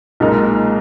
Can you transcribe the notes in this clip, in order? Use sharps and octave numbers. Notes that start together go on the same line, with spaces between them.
B1 A#2 G#3 D#4 A#4